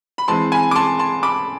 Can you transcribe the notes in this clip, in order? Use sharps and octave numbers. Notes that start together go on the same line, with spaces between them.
B5
E3 G#3 C4 A5 C6
G#5 B5
D6
A5 C6
A5 C6
B5 D6